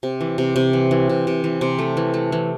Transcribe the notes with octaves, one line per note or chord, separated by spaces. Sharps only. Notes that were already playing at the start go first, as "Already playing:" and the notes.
C3
E3
C3
C3
E3
E3
C3
C3
E3
C3
A3
E3
A3
E3